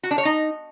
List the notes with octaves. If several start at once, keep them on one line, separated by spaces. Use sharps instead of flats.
F#4
D4
C#5
D#4